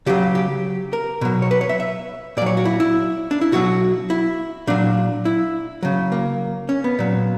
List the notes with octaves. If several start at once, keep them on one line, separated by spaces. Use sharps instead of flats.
C#3 F#3 G4
G4
A#4
B2 F#3
C#5
B4
C#5
E5
E5
A#2 F#3 C#5 D5
F#4
E4
E4
D4
E4
B2 F#3 F#4
E4
A#2 F#3 D4
E4
C#3 F#3
A#3
C#4
B3
A#2 F#3